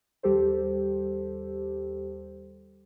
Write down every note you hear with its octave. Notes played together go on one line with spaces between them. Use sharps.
D#2 G3 G4 A4 C5